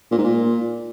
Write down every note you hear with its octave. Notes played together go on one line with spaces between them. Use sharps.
A#2
G#2
A#2